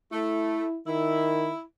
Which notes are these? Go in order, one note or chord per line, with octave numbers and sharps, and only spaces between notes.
A3 E4
D#3 E4